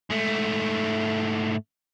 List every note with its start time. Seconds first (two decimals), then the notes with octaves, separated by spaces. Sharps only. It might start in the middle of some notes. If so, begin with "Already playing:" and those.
0.10 G#2 A3